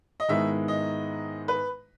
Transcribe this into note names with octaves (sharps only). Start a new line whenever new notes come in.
D#5
G#2 D#3 G#3 B3 E4 E5
D#5
B4